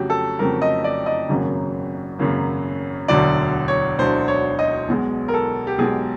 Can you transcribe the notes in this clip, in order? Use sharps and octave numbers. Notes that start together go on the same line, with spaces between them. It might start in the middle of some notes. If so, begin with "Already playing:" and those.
Already playing: F2 C#3 F#3 A3 F#4 G4
A4
F2 C#3 F#3 A3 A#4
D#5
D5
D#5
G#1 F#2 C#3 F#3 A#3
G#1 F#2 C#3 F#3 A#3
E1 D2 D3 F#3 D5
C#5
E1 D2 D3 F#3 C5
C#5
D#5
B1 B2 G#3
A#4
A4
G4
B1 B2 G#3 G#4